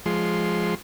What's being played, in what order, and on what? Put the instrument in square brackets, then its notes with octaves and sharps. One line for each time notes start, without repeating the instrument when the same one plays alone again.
[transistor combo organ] F3 G#3 C6